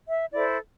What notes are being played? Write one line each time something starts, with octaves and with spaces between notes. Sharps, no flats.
E5
E4 A4 C5 D5